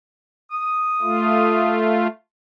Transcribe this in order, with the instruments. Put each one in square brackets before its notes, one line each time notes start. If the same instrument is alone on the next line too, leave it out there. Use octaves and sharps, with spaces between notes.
[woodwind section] D#6
[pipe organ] A3 F4